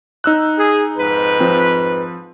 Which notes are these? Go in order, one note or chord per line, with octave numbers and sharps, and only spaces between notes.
D#4 E6 F#6
G#4
F2 G#2 B4
F3 C4